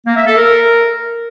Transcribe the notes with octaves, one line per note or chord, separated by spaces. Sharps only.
A#3
E5
A4
A#4